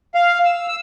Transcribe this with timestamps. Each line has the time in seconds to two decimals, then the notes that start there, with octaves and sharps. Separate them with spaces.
0.15 F5
0.45 E6
0.68 E6